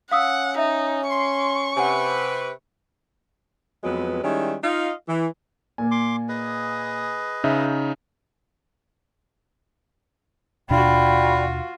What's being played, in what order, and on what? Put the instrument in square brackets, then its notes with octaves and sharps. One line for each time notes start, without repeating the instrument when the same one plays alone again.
[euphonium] C#4 [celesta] F5 D#6 E6 [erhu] F#5
[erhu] D#4 [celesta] E5
[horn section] C6 [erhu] C#6
[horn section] C3 B4 [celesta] F#5 G#5
[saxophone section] F2 F#3 G#3 B3 B4
D#3 G3 G#3 C#4 E4
D#4 F4 D#5 F5
E3
[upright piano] A#2 A#3 [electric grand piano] G#5
[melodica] C6 D6
G#4 B4 D#5
[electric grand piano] C#3 D#4 [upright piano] E5
[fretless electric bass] D#2 B2 D4 [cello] F4 F#4 [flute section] D5 G5 [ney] B5